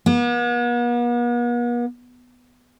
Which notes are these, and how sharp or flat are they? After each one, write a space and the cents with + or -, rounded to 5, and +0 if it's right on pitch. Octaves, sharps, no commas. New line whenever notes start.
B3 -45